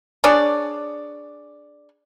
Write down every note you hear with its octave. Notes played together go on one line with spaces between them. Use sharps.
D4 G#4 C#5 D5